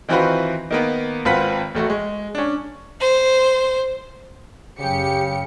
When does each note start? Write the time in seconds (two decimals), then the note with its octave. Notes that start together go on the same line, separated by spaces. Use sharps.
0.09 D#3 E3 C4 F4 F#4 B4
0.71 D#3 A#3 B3
1.25 G#1 C4 F4 B4 F#5 B6
1.75 A1 A3 F#4
1.90 G#3
2.35 C#4 D4
3.00 C5
4.79 F#2 C#3 G4 C#7